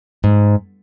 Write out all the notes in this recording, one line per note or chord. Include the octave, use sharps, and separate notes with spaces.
G#2